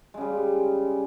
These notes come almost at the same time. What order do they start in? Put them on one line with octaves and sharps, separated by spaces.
G#3 C#3 G3